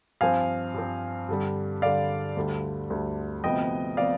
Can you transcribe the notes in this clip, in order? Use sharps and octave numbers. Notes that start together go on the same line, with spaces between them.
G2 F3 C4 F5 G#5
G2 F3 C4
G2 D3 G3
G2 D3 G3 D5 F5
D2 D3 G3
D2 D3 G3
D2 C3 F3 B3 D#5 G5
C3 F3 B3 D5 F5